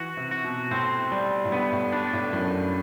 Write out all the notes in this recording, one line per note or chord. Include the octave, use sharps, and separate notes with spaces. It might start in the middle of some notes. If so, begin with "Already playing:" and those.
Already playing: E3 F#4
C3
F#4
B2
A2 C4
G3
A2
G2 B3
A2
G2 D4
A2
F#2 A2